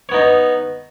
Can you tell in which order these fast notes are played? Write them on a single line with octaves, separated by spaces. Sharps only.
C#5 B3 D#4